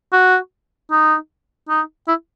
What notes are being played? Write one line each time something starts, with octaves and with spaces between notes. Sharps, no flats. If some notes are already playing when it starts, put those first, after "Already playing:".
F#4
D#4
D#4
E4